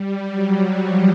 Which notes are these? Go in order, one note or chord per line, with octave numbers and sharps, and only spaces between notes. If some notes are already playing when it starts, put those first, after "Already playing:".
Already playing: G3
F#3
F3